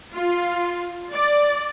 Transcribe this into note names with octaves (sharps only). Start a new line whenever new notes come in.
F4
D5